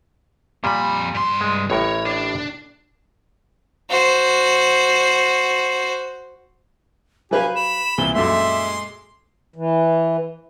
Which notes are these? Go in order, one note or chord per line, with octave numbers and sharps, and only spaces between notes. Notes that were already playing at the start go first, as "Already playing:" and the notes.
F2 A#2 G3 B5
G2 C6
G#3
A1 A2 A#4 C#5
D4
F#4 C5
F#3 G4 B4 F5 G#5
B5 E7
C2 A#2 E3 G7
F#2 A#2 G#3 A3 E5 C6 D6
E3